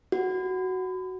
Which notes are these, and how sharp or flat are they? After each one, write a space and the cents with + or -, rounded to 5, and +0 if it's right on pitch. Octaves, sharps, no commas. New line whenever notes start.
F#4 +5